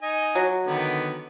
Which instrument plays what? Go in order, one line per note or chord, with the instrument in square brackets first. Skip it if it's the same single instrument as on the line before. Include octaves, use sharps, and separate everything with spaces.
[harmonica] D#4 D#5 G#5
[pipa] F#3
[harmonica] D3 D#3 B3